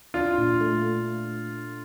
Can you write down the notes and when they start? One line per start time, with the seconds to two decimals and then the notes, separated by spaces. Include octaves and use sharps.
0.14 D4 F4
0.38 A#2
0.61 A3